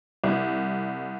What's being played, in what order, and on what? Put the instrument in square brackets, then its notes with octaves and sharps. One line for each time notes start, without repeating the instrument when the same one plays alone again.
[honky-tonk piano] C2